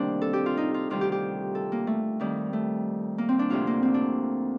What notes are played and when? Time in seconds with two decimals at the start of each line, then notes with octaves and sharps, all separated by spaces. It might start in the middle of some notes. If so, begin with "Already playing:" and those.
Already playing: D2 C3 D#3 G3 A#3 C4 D4
0.22 A4
0.33 G4
0.46 F4
0.57 D#4
0.74 F4
0.90 D2 C3 D#3 G3 F4
1.01 G4
1.12 G4
1.55 A4
1.72 A#3
1.87 A3
2.20 F2 D#3 G3
2.53 A3
3.18 A#3
3.29 C4
3.39 D4
3.50 D2 C3 F3 F4
3.67 A#3
3.83 C4
3.94 D4